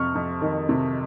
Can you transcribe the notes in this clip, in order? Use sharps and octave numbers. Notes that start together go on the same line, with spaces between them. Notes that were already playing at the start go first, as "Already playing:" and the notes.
Already playing: F2 C3 C#6 F6
F2
D#3
C3